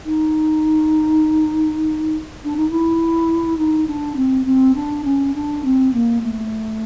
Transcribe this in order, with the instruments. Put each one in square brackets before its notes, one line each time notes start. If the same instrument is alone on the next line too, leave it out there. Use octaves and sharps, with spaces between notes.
[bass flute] D#4
D4
D#4
E4
D#4
D4
C4
C4
D4
C#4
D4
C4
A#3
A3